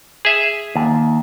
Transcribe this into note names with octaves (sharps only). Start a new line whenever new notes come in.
G#4 E5
D#2